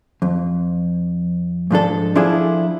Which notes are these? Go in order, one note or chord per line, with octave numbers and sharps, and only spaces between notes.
F2
G#2 F3 D4 A4
F3 D4 E4 F4 G#4 A4